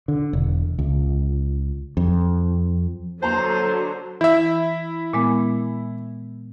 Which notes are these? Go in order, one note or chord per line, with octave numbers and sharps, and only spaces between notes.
D3
E1
C#2
F2
D3 F#3 C5 A5 A#5 C6
E3 E4 E5
A#2 G#3 B3